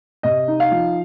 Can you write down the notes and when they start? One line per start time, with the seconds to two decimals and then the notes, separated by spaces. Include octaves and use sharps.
0.23 C3 D#5
0.48 D#4
0.60 F5
0.71 F3